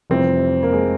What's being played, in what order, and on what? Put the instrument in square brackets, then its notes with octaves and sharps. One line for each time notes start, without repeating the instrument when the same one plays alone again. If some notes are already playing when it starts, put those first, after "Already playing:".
[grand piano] F1 F2 C3 E3 G3 [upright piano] C4
[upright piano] A#3
G#3